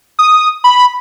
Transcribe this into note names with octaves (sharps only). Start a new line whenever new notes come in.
D#6
B5